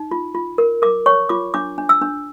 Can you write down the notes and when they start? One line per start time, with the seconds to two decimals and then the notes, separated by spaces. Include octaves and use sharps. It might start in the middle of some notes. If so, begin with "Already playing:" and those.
Already playing: D#4
0.11 F4
0.35 F4
0.58 A#4
0.82 A#4 D6
1.06 C#5 C#6
1.29 F4 D6
1.54 D4 D6
1.78 D4
1.89 E6
2.02 D4